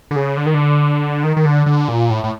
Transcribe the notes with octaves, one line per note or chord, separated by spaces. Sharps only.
D3
C#3
D3
D#3
D3
D#3
D#3
D3
D3
A#2
A2
A2